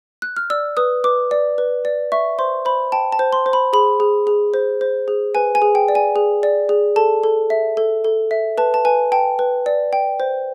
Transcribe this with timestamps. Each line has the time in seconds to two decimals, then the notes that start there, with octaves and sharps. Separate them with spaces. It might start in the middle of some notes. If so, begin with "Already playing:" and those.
0.22 F#6
0.37 F6
0.50 D5 E6
0.77 B4 D#6
1.04 B4 D6
1.31 D5
1.58 B4
1.85 D5
2.12 E5 C#6
2.39 C5 C6
2.65 C5 B5
2.92 G5 A5
3.12 A5
3.19 C5
3.33 C6
3.46 C5
3.53 B5
3.73 G#4 B5
4.00 G#4
4.27 G#4
4.54 C5
4.81 C5
5.08 G#4
5.35 B4 G#5
5.55 G#5
5.62 G#4
5.75 G5
5.88 D5
5.95 G#5
6.16 G#4
6.43 D5
6.69 G#4
6.96 A4 A5
7.23 A4
7.50 E5
7.77 A4
8.05 A4
8.31 E5
8.58 B4 A5
8.74 A5
8.85 B4 G#5
9.12 G5 A5
9.39 B4
9.66 D5
9.93 G5
10.20 C5